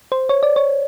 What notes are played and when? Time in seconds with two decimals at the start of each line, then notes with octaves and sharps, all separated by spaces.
0.12 C5
0.29 C#5
0.43 D5
0.56 C#5